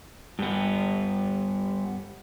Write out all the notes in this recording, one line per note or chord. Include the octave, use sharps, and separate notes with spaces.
G2 B3